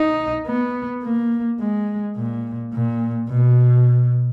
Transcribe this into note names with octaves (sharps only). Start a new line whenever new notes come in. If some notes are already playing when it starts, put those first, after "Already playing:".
Already playing: D#4
B3
A#3
G#3
A#2
A#2
B2